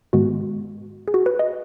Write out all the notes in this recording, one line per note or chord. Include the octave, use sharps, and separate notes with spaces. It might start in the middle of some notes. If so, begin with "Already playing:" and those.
G#2 D#3 G#3 B3 F#4
G#4
F#4
B4
D#5